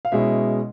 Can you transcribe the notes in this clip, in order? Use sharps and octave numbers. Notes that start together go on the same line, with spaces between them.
F5
B2 G#3 C#4 E4 E5